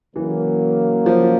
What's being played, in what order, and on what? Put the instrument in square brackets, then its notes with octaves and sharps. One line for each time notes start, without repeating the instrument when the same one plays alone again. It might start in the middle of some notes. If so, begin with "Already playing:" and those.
[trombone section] C#3 F#3 A#3 [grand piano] E3
[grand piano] F3